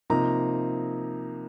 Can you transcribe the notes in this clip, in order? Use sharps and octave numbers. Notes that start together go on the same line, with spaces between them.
C3 F3 A#3 D#4 A#5